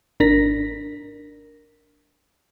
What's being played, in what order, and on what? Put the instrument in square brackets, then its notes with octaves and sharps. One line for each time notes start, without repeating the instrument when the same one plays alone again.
[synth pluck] G#1 D4 A#4 A#6 B6